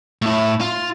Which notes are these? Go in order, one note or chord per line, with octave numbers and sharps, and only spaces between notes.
A2 E4
F4